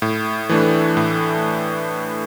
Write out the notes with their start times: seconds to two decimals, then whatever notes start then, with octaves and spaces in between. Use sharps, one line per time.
0.02 A2
0.49 E3 A3 D4
0.97 A2